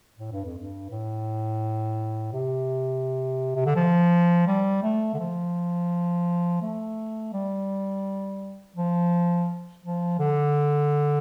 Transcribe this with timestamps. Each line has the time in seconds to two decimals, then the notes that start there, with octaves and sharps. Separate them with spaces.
0.19 A2
0.32 G2
0.45 F2
0.58 G2
0.90 A2
2.33 C3
3.56 C3
3.66 D3
3.76 F3
4.47 G3
4.83 A3
5.14 D3
5.19 F3
6.62 A3
7.33 G3
8.76 F3
9.83 F3
10.19 D3